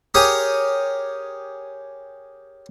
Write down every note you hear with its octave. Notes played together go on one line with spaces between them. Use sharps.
G4 G#4 A#4 C#5 G#5 D#6